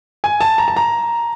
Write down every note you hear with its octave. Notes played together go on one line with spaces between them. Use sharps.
G#5
A5
A#5
A5
A#5